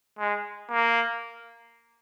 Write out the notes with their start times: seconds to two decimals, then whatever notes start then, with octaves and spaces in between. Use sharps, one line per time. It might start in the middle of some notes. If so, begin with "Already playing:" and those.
0.19 G#3
0.70 A#3